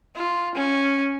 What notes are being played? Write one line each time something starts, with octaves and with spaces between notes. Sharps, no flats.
F4
C#4